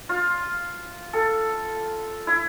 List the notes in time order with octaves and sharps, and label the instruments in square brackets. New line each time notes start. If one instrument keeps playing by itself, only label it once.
[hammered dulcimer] F4
A4
E4